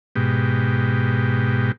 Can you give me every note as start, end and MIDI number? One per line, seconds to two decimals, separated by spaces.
0.16 1.72 44
0.16 1.72 47
0.16 1.72 67